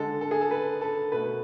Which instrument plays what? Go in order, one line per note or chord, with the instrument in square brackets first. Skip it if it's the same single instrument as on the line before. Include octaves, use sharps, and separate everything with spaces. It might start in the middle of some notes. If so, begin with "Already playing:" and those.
Already playing: [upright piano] D3 G#3 A4
A4
G#4
A4
B4
A4
B2 A3 B4